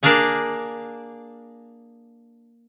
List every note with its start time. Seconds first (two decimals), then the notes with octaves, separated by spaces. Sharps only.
0.03 A#3 D4 G#4 F5 G#5